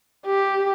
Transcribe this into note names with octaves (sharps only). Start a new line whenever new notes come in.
G4